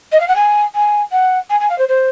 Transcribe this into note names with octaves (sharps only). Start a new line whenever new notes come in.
D#5
F5
F#5
G#5
G#5
F#5
G#5
G#5
F5
C5
C5